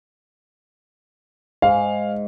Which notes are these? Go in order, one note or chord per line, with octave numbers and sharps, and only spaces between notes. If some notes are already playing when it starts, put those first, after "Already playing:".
G#2 F5